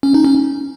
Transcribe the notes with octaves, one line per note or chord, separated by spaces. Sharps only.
C#4
D#4
C#4